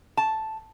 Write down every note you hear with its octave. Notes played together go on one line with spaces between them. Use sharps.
A5